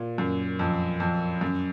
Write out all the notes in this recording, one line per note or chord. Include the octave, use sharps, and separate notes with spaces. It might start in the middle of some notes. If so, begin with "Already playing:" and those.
Already playing: A#2
F#2
F2
F2
F#2